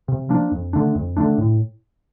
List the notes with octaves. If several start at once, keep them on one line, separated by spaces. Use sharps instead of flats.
C3
F3 A#3 D4
F2
D3 A3 D4
F2
D3 A3 D4
A2